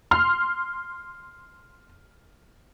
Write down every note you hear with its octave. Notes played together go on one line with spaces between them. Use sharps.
C6 F6